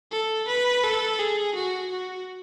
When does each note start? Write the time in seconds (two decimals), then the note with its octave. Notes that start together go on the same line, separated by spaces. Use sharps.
0.12 A4
0.48 B4
0.84 A4
1.19 G#4
1.55 F#4
1.91 F#4